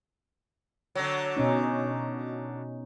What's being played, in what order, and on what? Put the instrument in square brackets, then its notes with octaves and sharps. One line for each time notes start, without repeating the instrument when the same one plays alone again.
[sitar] D3 F#3
[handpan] B2 C#4 D#4